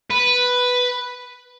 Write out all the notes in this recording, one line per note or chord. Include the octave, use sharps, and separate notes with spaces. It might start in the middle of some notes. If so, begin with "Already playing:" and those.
B4